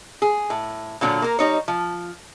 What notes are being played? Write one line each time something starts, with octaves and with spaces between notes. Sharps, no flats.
G#4
A2
A#2 D3 F#3 D4 F4
A#3 A#4
G3 D#4 C#5
F3